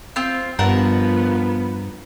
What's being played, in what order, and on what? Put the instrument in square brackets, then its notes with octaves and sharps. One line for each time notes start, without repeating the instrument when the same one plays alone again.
[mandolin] C4 F4
[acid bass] G2 [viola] F3 B3 [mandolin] A#4 F#5 A5